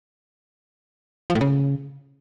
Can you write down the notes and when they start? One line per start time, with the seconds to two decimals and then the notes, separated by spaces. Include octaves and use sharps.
1.30 F3
1.35 A2
1.41 C#3